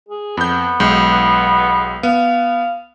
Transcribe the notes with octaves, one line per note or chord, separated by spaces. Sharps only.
G#4
F2 B3 G6
B1 G#3 G6
B3 F5